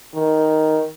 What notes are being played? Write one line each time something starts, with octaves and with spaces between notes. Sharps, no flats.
D#3